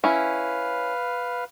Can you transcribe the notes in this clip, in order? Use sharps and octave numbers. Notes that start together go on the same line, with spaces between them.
C#4 E4 B4 F5